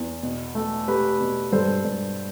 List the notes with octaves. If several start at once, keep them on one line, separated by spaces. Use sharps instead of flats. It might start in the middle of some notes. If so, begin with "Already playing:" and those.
Already playing: E2
B2
A3
A3 G4 B4
B2
G2 A4 C5
G2